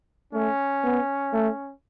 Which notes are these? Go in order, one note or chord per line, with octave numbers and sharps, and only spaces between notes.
A3 C#4
B3
A3